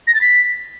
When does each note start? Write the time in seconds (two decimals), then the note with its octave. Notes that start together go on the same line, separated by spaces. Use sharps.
0.07 A#6
0.14 A6
0.21 B6